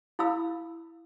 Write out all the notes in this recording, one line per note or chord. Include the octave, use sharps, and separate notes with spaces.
E4 F5 B5 E6